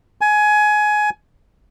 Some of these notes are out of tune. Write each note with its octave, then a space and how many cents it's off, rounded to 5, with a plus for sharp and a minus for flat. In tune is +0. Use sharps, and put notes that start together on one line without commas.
G#5 +20